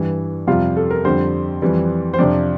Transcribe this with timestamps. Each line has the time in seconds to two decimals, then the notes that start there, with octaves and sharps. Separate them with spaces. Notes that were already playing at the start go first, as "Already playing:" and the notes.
Already playing: G2 E3 G3
0.47 F2 C3 G3 F4 F5
0.77 A4
0.91 A#4
1.05 F2 D3 G3 C4 C5
1.62 F2 E3 G3
2.14 C5
2.18 F2 C3 F3 D4 D5